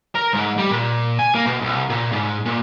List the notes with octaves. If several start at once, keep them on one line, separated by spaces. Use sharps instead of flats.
A#4
G#2
G3
A#2
G#5
A#3
B2
C2
A#2
G#2
A#2